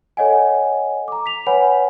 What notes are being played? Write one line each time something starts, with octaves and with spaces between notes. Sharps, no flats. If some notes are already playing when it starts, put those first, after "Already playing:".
A4 C#5 D#5 F#5 G#5
A#5 D6
B6 F7
B4 C#5 F#5 G#5 B5